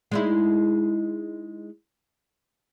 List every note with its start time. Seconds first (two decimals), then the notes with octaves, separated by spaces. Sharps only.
0.11 G#3 D#4 E4